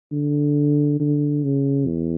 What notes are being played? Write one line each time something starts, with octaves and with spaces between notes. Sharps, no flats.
D3
D3
C#3
E2